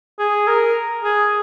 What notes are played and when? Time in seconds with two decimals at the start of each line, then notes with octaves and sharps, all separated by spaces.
0.19 G#4
0.47 A#4
1.04 G#4